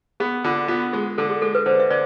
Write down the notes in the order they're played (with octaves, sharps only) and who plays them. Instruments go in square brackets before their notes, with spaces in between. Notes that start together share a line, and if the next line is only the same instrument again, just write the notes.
[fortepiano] B3 [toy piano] G#4
[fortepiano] D3 [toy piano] F4
[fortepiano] B3 [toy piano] F4
[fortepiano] G#3 [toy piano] G#4
[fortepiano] D3 [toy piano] A4
[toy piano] G#4
[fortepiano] G#3 [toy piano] A4
[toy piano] B4
[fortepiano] D3 [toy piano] C5
[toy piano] E5
[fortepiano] D3 [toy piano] D5